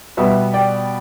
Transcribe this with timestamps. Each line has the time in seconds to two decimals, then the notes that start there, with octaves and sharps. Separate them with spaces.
0.17 B2 G3 B3 B4 E5
0.54 D5 G5